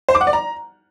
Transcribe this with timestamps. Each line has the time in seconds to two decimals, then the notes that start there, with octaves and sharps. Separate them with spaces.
0.09 C5
0.15 D6
0.21 F#5
0.27 D5
0.33 A#5